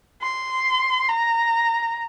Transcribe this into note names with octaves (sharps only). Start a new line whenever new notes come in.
C6
A#5